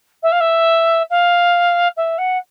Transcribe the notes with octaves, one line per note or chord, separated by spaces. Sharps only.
E5
F5
E5
F5
E5
F#5